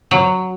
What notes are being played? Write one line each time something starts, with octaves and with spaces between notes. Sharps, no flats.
F#3